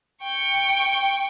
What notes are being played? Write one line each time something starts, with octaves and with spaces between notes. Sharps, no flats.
G5 C#6